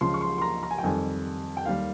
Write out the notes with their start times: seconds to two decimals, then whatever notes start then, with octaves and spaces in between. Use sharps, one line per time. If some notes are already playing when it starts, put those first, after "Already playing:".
0.01 C#2 C#3 F3 C6
0.14 C#6
0.21 C6
0.38 C6
0.42 A#5
0.63 A#5
0.71 G#5
0.78 G5
0.83 F2 D#3 G3 G#5
1.57 G5
1.66 D#2 D#3 G3 F5